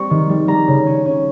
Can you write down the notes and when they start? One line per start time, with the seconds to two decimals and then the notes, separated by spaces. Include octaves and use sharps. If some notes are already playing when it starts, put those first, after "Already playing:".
Already playing: G3 C4 C#6
0.10 D#3
0.29 G3
0.48 G3 A#5
0.67 C#3
0.87 C#4
1.06 C#4